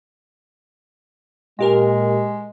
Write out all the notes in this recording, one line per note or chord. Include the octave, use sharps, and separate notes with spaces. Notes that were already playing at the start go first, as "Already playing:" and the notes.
A#2 G#3 G4 A#4